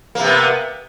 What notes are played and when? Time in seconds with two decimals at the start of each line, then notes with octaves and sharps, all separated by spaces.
0.15 A#3
0.20 C3
0.24 B3